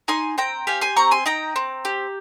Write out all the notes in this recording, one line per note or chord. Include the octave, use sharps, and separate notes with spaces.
D#4 G#5 C6
C4 G5 A#5
G4 F5 G#5
G#5 C6
C4 A#5 C#6
G#5 C6
D#4 G5 A#5
C4
G4